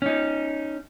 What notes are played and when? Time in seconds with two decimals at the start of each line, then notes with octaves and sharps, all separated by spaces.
0.02 C#4 D#4